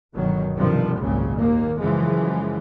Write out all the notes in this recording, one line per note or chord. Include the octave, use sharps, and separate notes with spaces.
G1 B2 D#3 F#3
B1 G2 C3 D#3 F3 G3
G#1 C#2 F#2 A#2 C#3
D#2 D#3 A#3
F#2 C#3 E3 F3 G#3